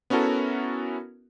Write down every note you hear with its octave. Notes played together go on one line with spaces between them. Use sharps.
B3 C#4 E4 F#4 A4 A#4